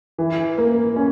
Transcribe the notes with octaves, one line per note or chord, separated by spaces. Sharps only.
E3
A#3
C#4